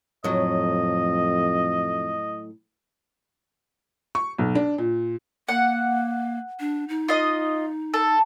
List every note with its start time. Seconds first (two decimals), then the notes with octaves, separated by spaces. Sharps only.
0.24 F2 A2 F#3 D#5
4.15 C#6
4.38 B1
4.55 D4
4.78 A#2
5.49 A#3 F#5
6.60 D4
6.88 D#4
7.08 F4 D#5
7.94 A4